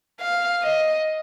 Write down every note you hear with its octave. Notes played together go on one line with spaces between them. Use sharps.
F5
D#5